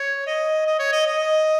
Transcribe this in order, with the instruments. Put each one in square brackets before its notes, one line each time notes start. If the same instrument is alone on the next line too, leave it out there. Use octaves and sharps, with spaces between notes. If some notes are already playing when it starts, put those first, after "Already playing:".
Already playing: [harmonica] C#5
D#5
D#5
C#5
D#5
D#5